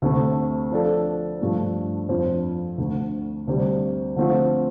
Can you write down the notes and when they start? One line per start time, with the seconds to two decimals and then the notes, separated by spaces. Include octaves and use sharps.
0.02 D2 C3 A3
0.72 F3 D4 A4 D5
1.40 G2 F3 A3 D4
2.09 F2 F3 D4 F4 C5
2.78 D2 D3 A3
3.47 D2 C3 G3
4.16 D3 F3 A3 C4 F4